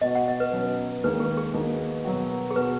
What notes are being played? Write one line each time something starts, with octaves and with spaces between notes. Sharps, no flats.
B2 B3 F#4 D#5
F#5
D#5
B4
B2 F#3 C#4
D#2 D#3 G#3 B4
G#4
G#4
D#2 D#3 B3 D#4 F#4
B2 F#3 B3 F#4
G#4
B2 B3 F#4 B4